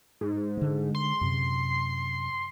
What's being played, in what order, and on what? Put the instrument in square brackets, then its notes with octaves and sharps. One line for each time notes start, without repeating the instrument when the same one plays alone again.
[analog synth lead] G#2
[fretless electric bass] D3 G#3
[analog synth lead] C6
[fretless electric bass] F#2 C3